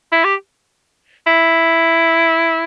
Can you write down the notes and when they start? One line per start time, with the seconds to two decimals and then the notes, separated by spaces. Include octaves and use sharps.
0.12 E4
0.24 G4
1.27 E4